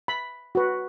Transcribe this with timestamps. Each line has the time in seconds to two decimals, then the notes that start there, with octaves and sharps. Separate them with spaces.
0.08 B5
0.55 F#4 B4